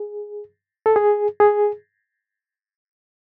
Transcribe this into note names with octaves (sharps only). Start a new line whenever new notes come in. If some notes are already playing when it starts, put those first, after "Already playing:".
Already playing: G#4
A4
G#4
G#4